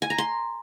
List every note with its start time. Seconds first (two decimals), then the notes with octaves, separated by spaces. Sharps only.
0.02 G#5
0.10 A#5
0.18 C6